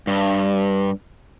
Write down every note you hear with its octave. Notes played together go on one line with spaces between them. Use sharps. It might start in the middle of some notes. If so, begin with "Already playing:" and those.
G2